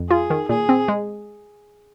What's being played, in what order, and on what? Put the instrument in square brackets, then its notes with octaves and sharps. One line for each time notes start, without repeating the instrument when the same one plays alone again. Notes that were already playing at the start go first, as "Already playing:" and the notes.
Already playing: [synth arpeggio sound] F2
[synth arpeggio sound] F4 [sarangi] G#4
[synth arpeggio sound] D#3
[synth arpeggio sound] A#2 [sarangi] G#4
[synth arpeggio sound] C4
G#3